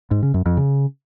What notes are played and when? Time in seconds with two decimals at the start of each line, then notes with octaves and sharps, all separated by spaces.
0.11 G#2
0.23 C#3
0.34 F#2
0.46 F2
0.57 C#3